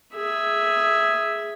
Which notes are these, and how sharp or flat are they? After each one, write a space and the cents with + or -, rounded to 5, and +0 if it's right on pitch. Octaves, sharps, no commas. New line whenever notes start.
G#4 +0 E5 +0